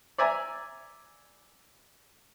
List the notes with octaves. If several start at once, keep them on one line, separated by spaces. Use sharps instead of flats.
D5 E5 G#5 A#5